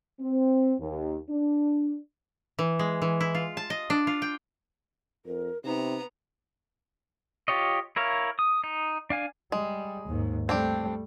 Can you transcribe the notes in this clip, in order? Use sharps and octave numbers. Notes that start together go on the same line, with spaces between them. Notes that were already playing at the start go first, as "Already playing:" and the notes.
C4
D#2
D4
E3
G#3
E3
E4
F4
A5
D#5
D4
F4
G5
F2 A#4
C3 B3 D#4 A#5
F4 G4 C#5 D#5
E4 A#4 C#5 F5
D#6
D#4
D4 F5 G#5
G3 G#3
D#2 G#2
G3 A3 C4 D4 G4